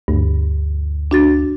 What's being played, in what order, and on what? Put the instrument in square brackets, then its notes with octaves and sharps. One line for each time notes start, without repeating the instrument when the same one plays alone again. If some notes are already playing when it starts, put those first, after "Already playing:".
[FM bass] D2 [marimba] G2
[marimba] D4 F#4 A6